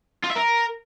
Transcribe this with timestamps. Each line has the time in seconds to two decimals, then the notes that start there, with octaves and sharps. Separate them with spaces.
0.24 F4
0.30 E5
0.36 A#4